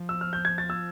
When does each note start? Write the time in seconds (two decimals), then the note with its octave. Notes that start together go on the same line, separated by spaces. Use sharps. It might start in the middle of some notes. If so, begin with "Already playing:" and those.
Already playing: F3
0.09 E6
0.21 F6
0.33 G6
0.45 G#6
0.58 A6
0.70 E6